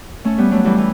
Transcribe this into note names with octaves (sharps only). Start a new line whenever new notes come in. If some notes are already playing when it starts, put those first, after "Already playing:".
A3 C#4
G3 B3
F#3 A3
E3 G3
E3